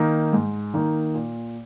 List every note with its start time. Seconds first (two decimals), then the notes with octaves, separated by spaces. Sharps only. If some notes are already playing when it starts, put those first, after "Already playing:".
Already playing: D#3 A#3 D#4
0.33 G#2
0.74 D#3 A#3 D#4
1.14 A#2